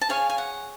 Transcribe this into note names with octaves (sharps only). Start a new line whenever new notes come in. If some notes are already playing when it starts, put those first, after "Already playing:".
A5
G#4 C#5 F5 G#5
G#5
F#5